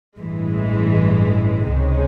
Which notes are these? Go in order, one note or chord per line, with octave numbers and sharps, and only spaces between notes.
A1 G2 E3 G#3
C#2 C3 D#3 G#3 C#4